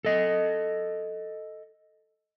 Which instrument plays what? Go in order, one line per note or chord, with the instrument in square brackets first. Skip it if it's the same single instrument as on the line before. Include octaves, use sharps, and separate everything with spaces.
[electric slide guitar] A4 D#5